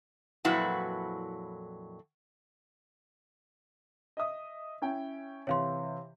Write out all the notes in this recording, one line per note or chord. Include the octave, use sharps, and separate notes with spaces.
F2 A#2 F#3 E4 F#4 B4
D#5 E5 D#6
C#4 E4 G5
C3 E3 C#5 F5 C6